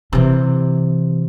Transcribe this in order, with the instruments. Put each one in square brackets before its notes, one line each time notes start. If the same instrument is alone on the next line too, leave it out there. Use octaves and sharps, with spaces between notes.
[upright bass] C3 E3